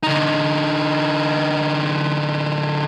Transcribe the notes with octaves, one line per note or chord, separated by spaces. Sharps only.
D3 D#4